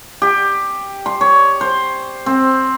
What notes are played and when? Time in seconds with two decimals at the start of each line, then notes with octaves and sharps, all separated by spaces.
0.22 G4
1.06 C6
1.21 C#5
1.61 C5
2.26 C4